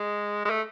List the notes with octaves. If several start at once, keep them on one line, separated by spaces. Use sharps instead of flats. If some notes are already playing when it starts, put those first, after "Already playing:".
Already playing: G#3
G#3
A3